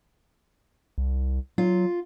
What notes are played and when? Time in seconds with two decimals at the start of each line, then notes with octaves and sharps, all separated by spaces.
0.98 C2
1.58 F#3 F4